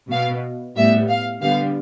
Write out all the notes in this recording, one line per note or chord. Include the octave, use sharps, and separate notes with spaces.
B2 B3 F5
A2 G3 B3 E5
F5
D3 G3 B3 F5